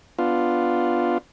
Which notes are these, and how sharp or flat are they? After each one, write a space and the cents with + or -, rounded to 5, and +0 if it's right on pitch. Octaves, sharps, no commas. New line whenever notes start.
B3 +0 D4 +0 F4 +0